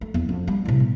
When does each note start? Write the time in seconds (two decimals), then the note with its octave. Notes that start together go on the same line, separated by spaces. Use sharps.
0.01 A3
0.14 E2
0.29 F2
0.47 G3
0.65 A2 C3
0.80 B3